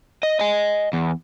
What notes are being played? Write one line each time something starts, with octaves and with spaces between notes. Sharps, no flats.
D#5
D#5 G#5
E2